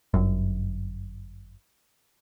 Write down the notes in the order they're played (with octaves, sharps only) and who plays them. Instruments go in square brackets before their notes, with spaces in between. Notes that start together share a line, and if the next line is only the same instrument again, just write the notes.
[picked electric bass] G1 F#2